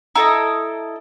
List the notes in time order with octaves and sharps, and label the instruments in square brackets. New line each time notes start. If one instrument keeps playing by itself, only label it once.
[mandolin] E4 A4 D#5 [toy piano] A#5